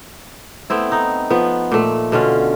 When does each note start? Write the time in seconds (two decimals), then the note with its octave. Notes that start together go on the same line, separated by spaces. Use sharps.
0.70 A3 B3 C4 E4
0.92 D#4
1.30 F3 B3 B4
1.72 A#2 A3
2.12 B2 D3 C#4 F4